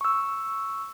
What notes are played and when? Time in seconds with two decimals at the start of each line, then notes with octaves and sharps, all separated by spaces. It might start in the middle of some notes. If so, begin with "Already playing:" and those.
0.01 C#6 E6